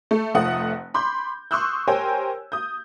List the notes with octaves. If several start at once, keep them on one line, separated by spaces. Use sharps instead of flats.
A3
F1 F3 A3 F#5 D#6
B5 C6 D6 G6
C6 C#6 D#6 E6 F#6 G6
G4 A#4 C5 C#5 G5 G#5
D#6 G6